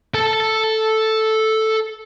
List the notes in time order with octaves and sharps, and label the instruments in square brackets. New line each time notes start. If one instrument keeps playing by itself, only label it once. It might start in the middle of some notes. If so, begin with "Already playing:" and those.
[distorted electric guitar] A4 A5